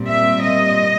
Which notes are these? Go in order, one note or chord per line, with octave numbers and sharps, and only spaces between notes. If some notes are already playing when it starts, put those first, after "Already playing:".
Already playing: A#2 G3 C4
E5
D#5